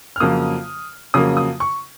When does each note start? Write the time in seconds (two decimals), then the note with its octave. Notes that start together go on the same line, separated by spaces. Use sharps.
0.16 F6
0.20 F2 C#3 F#3 A#3 D#6
1.14 F2 C#3 F#3 A#3 D#6
1.37 D#6
1.60 C#6